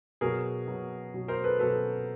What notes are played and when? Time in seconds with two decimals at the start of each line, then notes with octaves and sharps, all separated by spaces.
0.21 B2 F#3 G#4 A#4
0.67 B2 F#3
1.14 B2 F#3
1.28 A#4 C5
1.44 A4 B4
1.59 B2 F#3 A4 B4